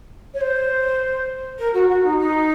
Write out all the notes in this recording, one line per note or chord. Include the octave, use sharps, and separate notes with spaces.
C#5
C5
A#4
F#4
F#4
D#4
D#4